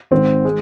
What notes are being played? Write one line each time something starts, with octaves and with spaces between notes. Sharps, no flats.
G#1 G#2 D#3 C4
D#3 G#3